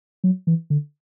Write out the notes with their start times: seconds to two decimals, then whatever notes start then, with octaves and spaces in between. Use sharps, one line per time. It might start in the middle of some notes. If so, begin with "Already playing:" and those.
0.24 F#3
0.47 E3
0.70 D3